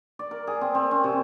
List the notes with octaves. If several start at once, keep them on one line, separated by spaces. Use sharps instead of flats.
D5
A#4
G#4
C4
C4
C#4
C3